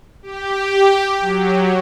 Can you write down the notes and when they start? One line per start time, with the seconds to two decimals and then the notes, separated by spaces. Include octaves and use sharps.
0.23 G4
1.21 F#3